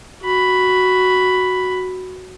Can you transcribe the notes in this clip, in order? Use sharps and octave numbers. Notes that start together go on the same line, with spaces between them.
F#4 B5